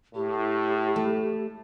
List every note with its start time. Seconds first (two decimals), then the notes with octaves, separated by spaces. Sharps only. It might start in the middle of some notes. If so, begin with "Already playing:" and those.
0.15 A2 G4
0.96 A3